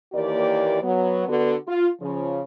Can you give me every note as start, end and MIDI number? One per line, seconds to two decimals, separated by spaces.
0.13 0.80 39
0.13 0.80 52
0.13 0.80 58
0.13 0.80 67
0.13 0.80 74
0.82 1.28 54
0.82 1.28 59
1.28 1.54 50
1.28 1.54 59
1.28 1.54 66
1.68 1.87 65
2.00 2.41 49
2.00 2.41 53